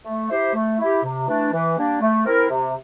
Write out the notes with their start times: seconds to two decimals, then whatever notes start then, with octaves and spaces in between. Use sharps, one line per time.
0.06 A3
0.30 E4 G4 C5
0.54 A3
0.79 E4 G4
1.03 C3
1.28 E3 A3 D4
1.52 E3
1.77 G3 A#3 D4
2.01 A3
2.25 C4 E4 A#4
2.50 C3